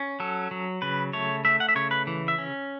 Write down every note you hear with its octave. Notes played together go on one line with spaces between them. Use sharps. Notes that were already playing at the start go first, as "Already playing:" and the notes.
Already playing: C#4
F#3 A4
F#3
C#3 B4
A3 C#5
A3 E5
F#5
E5
C#3 C#5
B4
E3
E5
C#4